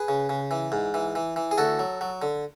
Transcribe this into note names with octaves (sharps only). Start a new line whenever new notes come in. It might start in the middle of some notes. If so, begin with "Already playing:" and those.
Already playing: G#4 B4
C#3
C#3
E3
G#2
E3
E3
E3
G#4
D2 F#4 A4
F#3
F#3
D3